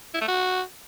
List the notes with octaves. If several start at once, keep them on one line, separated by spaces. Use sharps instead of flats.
E4
A3
F#4